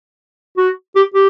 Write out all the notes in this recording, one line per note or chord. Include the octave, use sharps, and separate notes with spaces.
F#4
G4
G4